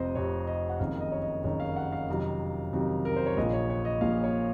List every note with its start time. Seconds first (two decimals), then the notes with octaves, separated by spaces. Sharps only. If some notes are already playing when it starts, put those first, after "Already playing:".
Already playing: F1 F2 C3 C5 D#5
0.15 F1 F2 C3 C#5
0.47 D#5
0.70 F#5
0.79 F#1 F2 D#3 F5
1.01 D#5
1.12 C#5
1.22 D#5
1.44 F#1 F2 D#3 C#5
1.60 F5
1.76 F#5
1.92 F5
2.09 F2 C3 D#3 F#3
2.73 F2 C3 D#3 F#3
3.05 A#4
3.16 C5
3.26 C#5
3.37 A#1 A#2 F3 D#5
3.53 C#5
3.70 C#5
3.85 D#5
4.01 A#1 A#2 F3 F5
4.24 C#5